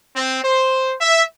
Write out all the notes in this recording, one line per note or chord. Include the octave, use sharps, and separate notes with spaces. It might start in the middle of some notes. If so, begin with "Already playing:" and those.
C4
C5
E5